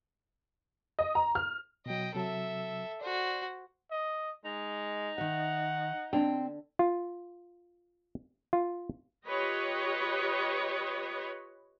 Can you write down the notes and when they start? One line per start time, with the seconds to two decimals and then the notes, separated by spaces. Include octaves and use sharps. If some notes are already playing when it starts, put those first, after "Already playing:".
0.99 D#5
1.15 A#5
1.35 F6
1.86 B2 F#3 D#5 G5
2.15 C3 F#3 A4 E5 A5
3.01 F#4 C5 D5
3.91 D#5
4.45 G#3 D#4
5.18 D#3 E5 F#5
6.13 D3 C4 C5 G5
6.79 F4
8.53 F4
9.26 F4 G4 B4 C#5 D#5